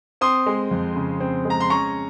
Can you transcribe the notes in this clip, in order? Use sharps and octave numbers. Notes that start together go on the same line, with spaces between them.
C4 C6 D#6
G#3
F2
C#3
C4
G#3
A#5
C6
C#4 A#5 C#6